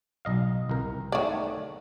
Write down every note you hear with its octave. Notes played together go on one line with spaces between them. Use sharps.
B1 D#5 F5
C2 A#4
D#3 A3 C#5 D5